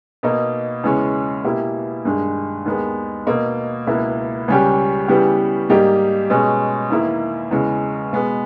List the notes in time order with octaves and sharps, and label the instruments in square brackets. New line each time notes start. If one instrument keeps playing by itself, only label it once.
[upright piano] B2 A#3 D#4
E2 C#3 G#3 C#4
B2 A#3 E4 G4
G2 D#3 G#3
D#2 D#3 G#3 B3
B2 A#3 D#4
C#2 B2 A#3 E4
C#2 C#3 G3 C#4 G4
C#3 E3 G3 B3 G4
G#2 G3 A#3 D#4 G4
B2 G#3 C#4
E2 D#3 A#3 E4
E2 C#3 G#3
B2 G#3 B3